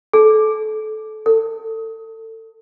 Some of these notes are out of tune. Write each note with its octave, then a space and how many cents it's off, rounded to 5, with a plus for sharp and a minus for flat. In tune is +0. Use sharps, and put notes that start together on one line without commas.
A4 -25
A4 +25